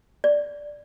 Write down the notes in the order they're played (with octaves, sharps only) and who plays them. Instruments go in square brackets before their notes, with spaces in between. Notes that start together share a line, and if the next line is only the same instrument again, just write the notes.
[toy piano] D5